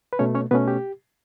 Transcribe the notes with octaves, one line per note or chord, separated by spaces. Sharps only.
B4
B2 A3 C#4 C#5
C#4 C#5
B2 A3 B3 C#4 B4
G4